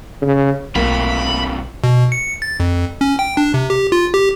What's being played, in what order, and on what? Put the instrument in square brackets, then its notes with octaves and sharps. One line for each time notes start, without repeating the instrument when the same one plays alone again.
[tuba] C#3
[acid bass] B1 [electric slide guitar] G2 C3 F4 [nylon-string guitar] A3 A#3 [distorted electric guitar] B5
[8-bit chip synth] B2
C#7
A6
F2
C#4
G5
D4
C3
G4
F4
G4